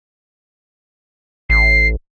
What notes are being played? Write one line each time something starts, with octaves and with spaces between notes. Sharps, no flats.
A1 C7